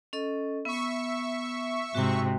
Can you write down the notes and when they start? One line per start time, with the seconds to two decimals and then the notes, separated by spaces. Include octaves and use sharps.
0.13 C#4 A4 D#5
0.65 B3 E5 C#6
1.95 G#2 C3 F#4 G5